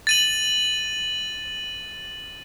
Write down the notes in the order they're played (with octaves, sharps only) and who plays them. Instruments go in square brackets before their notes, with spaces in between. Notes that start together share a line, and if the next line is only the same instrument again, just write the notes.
[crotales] A6 D#7 F#7